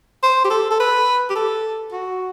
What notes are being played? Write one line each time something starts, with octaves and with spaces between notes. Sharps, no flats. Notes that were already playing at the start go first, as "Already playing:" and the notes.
C5
G4
A4
A4
B4
G4
A4
F#4